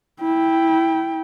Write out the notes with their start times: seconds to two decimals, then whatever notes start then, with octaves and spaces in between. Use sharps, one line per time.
0.21 E4 G5